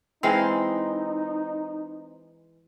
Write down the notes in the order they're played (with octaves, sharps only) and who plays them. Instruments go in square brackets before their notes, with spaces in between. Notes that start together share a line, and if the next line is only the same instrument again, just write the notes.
[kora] E3 G#3 F5 [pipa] C4 [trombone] D#4